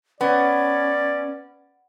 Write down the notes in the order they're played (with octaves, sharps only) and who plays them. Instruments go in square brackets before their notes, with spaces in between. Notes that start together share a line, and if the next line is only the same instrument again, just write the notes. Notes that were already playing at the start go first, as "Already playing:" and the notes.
[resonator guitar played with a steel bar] B3 [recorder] C#4 [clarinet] D5